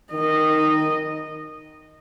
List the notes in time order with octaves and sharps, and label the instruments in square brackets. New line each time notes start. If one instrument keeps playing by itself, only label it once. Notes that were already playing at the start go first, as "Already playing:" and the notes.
[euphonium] D#3 [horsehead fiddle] D#5